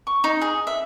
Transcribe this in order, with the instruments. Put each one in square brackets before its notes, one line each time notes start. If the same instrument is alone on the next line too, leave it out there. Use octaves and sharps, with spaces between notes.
[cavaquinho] C#6
D#4
G#4
E5